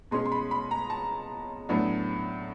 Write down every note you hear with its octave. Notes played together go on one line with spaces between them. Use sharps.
B2 G#3 C#4 C6
C6
B5
B5
A#5
A5
A2 F#3 B3 D4